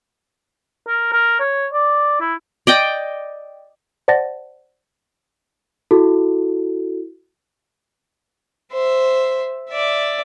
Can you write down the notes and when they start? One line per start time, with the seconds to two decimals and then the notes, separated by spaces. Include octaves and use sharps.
0.88 A#4
1.12 A#4
1.40 C#5
1.73 D5
2.20 E4
2.67 D5 D#5 G5
4.08 C5 D5 F#5 A5 A6 A#6
5.91 E4 F#4 A4
8.72 C5 E5
9.70 D5 E5